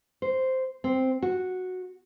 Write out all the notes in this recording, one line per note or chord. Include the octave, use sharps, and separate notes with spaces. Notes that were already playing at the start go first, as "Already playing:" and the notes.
C5
C4
F#4